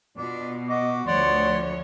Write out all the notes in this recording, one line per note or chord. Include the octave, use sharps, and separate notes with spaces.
B2 D4 F4
F#4 D#5 D6
D2 F3 C#5 D5 F#5 C6